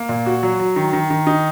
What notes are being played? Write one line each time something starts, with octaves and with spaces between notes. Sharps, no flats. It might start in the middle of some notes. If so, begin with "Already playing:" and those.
Already playing: A#3
A#2
F#4
F#3
F#3
D#3
D#3
D#3
D#4